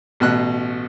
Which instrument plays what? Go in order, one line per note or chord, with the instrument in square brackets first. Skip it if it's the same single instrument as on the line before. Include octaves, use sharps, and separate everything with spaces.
[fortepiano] A1 B2 F#6